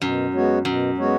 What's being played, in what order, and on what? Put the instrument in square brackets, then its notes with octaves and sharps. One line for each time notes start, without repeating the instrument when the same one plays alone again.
[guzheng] F#2 [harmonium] B2
[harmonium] G#3 B3 F#4 C#5
[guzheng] F#2 [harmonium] B2
[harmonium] G#3 B3 F#4 C#5